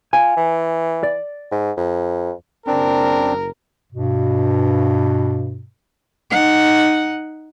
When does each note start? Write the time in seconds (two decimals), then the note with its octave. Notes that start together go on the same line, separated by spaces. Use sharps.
0.13 F4 G#5
0.37 E3
1.03 D5
1.52 G#2
1.77 F2
2.67 F#1 C4 D4 A#4
3.93 G2 B2
6.31 D#4 F#5